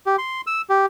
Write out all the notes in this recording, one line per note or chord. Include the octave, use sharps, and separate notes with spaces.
G4
C6
E6
G4